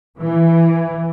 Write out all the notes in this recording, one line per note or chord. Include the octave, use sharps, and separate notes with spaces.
E3